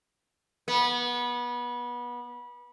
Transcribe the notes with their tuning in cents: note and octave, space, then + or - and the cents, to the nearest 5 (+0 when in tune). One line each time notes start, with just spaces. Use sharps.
B3 -25